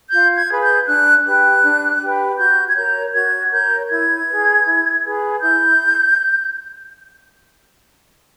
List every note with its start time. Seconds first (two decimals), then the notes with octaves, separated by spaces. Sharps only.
0.10 F4 G6
0.36 G#6
0.49 G#4 B4
0.62 G6
0.87 D4 F#6
1.24 G4 B4 F#6
1.63 D4
2.01 G4 B4
2.38 F#4 G6
2.68 G#6
2.76 A#4 C#5 G6
3.14 F#4 G#6
3.52 A#4 C#5 G6
3.90 E4 G#6
4.27 G#4 B4
4.65 E4
5.04 G#4 B4
5.41 E4 G6